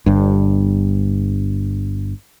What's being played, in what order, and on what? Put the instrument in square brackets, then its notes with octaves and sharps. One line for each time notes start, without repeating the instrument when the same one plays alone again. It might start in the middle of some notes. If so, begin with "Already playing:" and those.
[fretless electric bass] G1 G2